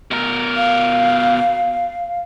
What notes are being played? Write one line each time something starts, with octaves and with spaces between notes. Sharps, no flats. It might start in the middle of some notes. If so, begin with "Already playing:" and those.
B2 A#4
F5